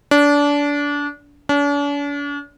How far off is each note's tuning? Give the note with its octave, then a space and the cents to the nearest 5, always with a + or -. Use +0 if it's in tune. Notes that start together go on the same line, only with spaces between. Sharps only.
D4 -25
D4 -45